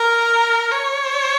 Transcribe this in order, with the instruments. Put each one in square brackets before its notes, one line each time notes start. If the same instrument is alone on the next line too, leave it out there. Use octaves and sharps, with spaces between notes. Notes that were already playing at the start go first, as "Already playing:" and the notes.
Already playing: [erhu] A#4
C#5